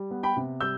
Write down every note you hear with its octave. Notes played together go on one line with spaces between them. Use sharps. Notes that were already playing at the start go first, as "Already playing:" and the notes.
Already playing: G3
B3
G5 B5
C3
G3 E6 G6